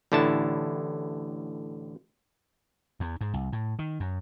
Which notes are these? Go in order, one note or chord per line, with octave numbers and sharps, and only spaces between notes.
A1 A2 D3 E4 A5
E2
G#2
C2
A2
D#3
F#2